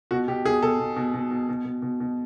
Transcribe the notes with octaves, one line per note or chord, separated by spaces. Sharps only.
B2 F#4
B2 G4
B2 G#4
B2 A4
B2
B2
B2
B2
B2
B2
B2
B2